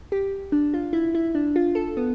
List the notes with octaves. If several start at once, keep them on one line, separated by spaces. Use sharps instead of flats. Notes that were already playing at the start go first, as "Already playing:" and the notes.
G4
D4
F4
E4
E4
D4
F4
A4
B3